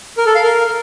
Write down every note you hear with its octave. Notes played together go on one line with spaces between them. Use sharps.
A#4
A4
F5
A#4